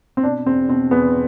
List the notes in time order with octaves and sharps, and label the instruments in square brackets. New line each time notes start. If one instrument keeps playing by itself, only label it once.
[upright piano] C4
B2 D4
E2 C4
B2 C4
E2 B3